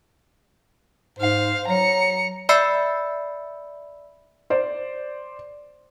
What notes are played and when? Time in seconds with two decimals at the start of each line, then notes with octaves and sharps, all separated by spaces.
1.19 G#2 C5 F5
1.68 F#3 A#5 C#7
2.49 D5 E5 B5 E6 C7 C#7
4.50 C5 D5